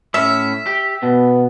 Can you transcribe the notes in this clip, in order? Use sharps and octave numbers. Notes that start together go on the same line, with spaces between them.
A2 C#4 E5
G4
B2 B3